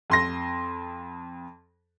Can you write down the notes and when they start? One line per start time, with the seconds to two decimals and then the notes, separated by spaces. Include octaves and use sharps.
0.10 F2 C6 A#6